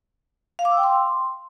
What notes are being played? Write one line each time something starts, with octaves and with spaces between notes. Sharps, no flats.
F5
D6
E6
G5
C6